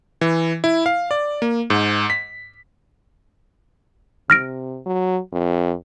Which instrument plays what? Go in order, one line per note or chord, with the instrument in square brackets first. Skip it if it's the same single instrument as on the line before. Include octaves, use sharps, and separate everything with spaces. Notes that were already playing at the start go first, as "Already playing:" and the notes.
[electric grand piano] E3
E4
F5
D5
A#3
G#2
B6
[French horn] C3 [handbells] F6 A#6 D7
[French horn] F#3
F2